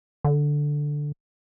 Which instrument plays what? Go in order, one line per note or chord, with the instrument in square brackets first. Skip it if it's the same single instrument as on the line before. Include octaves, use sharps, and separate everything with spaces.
[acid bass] D3